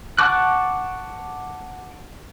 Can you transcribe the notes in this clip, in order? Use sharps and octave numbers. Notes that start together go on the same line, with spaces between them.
F#5 A5 C#6 D6 F#6